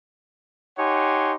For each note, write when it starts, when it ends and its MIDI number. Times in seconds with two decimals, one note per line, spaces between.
0.78 1.33 63
0.78 1.33 67
0.78 1.33 73
0.78 1.33 78
0.78 1.33 80
0.78 1.33 84